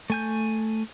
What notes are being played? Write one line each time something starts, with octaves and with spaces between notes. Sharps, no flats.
A3 G#5 G6